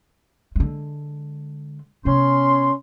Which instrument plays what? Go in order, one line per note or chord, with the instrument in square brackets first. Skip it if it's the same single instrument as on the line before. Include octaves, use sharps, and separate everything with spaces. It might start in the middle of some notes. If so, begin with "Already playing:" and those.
[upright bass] D3 G#3
[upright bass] C3 B3 [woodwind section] C#4 C6